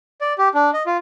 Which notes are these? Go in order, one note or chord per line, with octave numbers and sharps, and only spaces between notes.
D5
G4
D4
D#5
F4